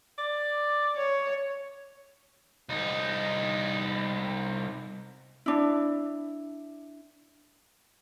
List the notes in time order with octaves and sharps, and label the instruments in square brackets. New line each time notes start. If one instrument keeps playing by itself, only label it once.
[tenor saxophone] D5
[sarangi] C#5
[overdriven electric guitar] C2 D#4
[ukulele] D4 E4